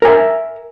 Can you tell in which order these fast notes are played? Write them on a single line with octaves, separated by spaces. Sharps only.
A#4 G#5 E5